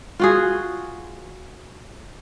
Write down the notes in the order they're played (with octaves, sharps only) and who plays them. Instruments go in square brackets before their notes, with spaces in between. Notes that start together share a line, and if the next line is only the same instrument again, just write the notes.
[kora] F4 F#4 G#4